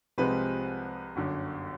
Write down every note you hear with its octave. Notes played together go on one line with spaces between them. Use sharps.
C2 C3 F3 G#3 C4 B4
G1 F#2 D3